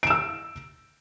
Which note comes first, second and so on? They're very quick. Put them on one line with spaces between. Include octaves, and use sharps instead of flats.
D7 E7 E6